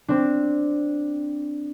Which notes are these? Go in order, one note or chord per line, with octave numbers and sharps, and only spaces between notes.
C4 D4